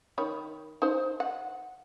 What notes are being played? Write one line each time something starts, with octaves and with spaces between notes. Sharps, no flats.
D#3 C#5 B5
D#4 C5
F#5